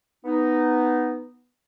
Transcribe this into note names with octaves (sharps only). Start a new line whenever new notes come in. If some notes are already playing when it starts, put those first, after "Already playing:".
B3 D#4